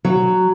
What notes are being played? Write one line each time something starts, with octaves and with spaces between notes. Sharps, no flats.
F#3